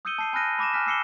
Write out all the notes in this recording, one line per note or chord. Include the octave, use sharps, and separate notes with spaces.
D#6 E6 G6 C#7 D#7 G7
A5 C7 D#7
G#5 B5 F6 F#6 A#6 D#7
B5 D6 A#6 E7
G#5 F6 F#6 B6
D6 E6 C7 C#7 E7 G7